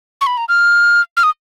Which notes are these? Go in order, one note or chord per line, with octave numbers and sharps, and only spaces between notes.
C#6
B5
A#5
F6
F6
D#6